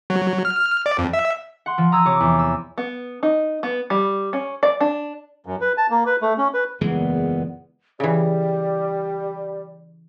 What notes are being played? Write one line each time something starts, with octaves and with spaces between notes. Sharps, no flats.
F#3
F6
F6
D5
F2
E5
F#5 C6
F3
A#5 D#6 E6 G#6
C3 C#5 D6
E2
E6
B3
D#4
B3
G3
C#4
D5
D4
F#2
B4
A5
A#3
B4
A3
C#4
B4
F#1 E2 A#2 E3 G#3 B3
C#3 E3 G3 D5